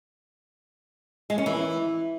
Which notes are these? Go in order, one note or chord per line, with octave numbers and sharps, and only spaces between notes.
G#3
C#4
E3